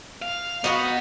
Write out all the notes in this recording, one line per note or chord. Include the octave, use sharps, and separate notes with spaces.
F5
B3 D#4 F#4 B4